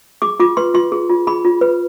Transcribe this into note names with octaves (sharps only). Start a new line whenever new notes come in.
G#4 D6
F4 D6
B4 C6
F4 C6
G#4
F4
G#4 B5
F4
B4